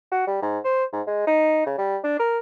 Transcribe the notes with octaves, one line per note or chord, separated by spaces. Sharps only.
F#4
G3
G#2
C5
G#2
G#3
D#4
C#3
G3
D4
A#4